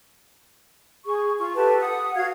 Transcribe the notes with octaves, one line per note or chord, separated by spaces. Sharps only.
G#4 C#6
F4 C#6
G4 A4 B4 A5
F#5 D#6
F#4 F5 G#6